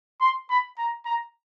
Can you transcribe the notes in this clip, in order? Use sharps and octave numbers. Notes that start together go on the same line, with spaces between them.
C6
B5
A#5
A#5